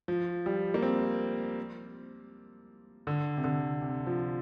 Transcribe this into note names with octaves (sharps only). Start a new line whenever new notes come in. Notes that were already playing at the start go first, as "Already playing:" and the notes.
F3
G3
A#3
C4
D3
C3
D3
C3
F3